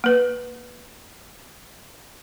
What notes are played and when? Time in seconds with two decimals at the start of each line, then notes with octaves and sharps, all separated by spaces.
0.04 A#3 B4